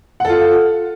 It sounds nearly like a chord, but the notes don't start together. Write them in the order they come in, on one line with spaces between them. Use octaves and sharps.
F#5 A4 F4